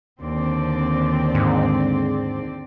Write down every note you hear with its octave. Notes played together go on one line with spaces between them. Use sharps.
D#2 D3 C4 D5
G#2